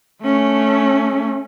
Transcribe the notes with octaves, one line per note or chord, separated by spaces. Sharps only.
A3 C#4